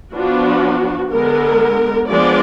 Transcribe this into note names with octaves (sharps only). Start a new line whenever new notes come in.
F3 B3 D4 F#4
D3 G#3 B3 A#4
F3 G#3 B3 D4 D5